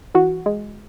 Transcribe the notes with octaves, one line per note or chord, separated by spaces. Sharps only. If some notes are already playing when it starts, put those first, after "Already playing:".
E3 F#4
G#3